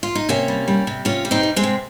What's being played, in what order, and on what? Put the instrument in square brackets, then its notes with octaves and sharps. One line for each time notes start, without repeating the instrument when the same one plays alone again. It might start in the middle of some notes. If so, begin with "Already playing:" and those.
[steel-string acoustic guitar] F4
D#4
C3 A#3 C#4
G3
G3
C3
C3 C#4 F4
G3
C4 D#4
G3
G#3 C4
C3